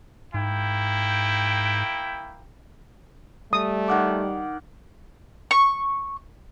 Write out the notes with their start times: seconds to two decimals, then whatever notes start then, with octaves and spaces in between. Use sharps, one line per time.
0.34 G#2 A#3 E4 G5
3.53 G3 A3 D#6
3.88 D#3 F#5 D6
5.51 C#6